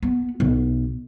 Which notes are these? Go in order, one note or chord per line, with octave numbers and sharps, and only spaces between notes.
B3
B1